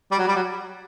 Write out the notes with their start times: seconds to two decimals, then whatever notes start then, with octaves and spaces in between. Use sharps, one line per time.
0.11 G3
0.18 F#3
0.28 G3
0.35 F#3